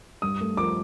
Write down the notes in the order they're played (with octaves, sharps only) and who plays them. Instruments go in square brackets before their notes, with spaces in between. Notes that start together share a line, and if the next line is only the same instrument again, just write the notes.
[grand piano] G2 D#6
A3
F3 D6